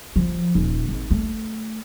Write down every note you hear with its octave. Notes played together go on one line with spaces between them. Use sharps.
F3
D#1
G#1
A3